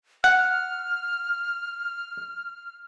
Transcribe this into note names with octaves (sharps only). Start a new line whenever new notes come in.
F#5 F6